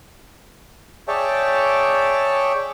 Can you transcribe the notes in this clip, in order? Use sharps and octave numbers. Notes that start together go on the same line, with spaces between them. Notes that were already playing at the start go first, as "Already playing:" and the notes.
G#4 C#5 D5 E5 G5 A5